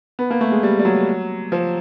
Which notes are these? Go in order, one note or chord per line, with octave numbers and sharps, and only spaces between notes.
B3
A#3
A3
G#3
G3
G3
F#3
F3